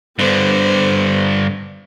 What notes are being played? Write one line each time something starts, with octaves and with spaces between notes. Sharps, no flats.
G2 D3 B3 C5